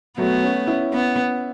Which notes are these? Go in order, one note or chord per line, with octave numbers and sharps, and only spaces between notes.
F#3 A3 B3
A3 C#4
C#4 E4
B3